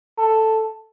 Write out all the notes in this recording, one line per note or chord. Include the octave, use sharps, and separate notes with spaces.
A4